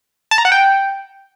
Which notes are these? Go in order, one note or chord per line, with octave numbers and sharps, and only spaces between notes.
A5
A#5
F#5
G5